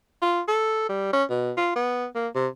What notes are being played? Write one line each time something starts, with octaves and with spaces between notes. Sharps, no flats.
F4
A4
G3
C#4
B2
F4
B3
A#3
C3